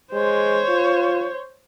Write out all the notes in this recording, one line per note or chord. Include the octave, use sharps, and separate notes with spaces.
G#3 C5 C#5
F4